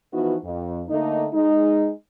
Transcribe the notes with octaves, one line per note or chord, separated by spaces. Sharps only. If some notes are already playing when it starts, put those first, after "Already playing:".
E3 F3 B3 D#4 E4 F#4
F2
D3 A3 A#3 D#4
G#3 D#4